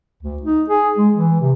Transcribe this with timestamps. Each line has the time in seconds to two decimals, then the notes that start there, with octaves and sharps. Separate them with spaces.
0.23 D2
0.42 D#4
0.69 G#4
0.97 G#3
1.14 E3
1.40 C3